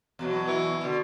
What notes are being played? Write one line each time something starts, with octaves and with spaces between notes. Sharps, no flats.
E2 B2 F#3
E3
B2 D3